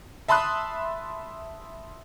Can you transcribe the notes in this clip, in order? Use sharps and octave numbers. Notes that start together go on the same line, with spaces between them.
E5 A5 B5 C6 D#6 F#6